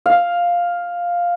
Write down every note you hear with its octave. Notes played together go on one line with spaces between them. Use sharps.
F5